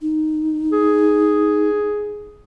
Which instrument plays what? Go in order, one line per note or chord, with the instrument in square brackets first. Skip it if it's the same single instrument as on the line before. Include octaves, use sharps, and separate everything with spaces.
[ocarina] D#4
[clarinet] G#4